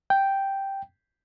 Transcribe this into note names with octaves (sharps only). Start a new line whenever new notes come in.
G5